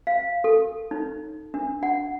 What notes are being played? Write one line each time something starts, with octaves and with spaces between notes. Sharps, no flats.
F5
A4
D#4
D4
F#5